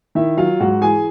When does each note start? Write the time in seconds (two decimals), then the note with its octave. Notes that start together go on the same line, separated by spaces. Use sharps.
0.15 D#3 E4 E5
0.37 F#3 F4 F5
0.60 G#2 F#4 F#5
0.81 E3 G#4 G#5